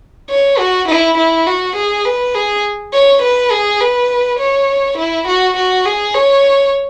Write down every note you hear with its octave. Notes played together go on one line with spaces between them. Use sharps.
C#5
F#4
E4
E4
F#4
G#4
B4
G#4
C#5
B4
G#4
B4
C#5
E4
F#4
F#4
G#4
C#5